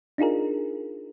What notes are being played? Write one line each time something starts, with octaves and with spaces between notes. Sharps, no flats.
D4 D#4 F4 G#4 A#4